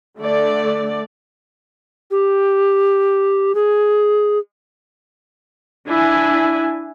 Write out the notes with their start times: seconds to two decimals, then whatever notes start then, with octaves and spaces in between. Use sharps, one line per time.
0.19 D3 A3 D5
2.11 G4
3.55 G#4
5.87 D4 E4 G#5